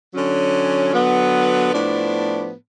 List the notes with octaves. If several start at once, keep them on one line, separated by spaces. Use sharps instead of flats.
D3 F#3 C#4
D3 F#3 B3
A2 F3 B3 D4